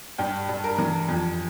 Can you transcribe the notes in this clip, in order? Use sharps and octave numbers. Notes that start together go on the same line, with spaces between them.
G2 G5
G2
A#4
E3
F2